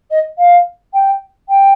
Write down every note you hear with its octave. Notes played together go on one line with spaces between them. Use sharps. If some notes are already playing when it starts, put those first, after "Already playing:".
D#5
F5
G5
G5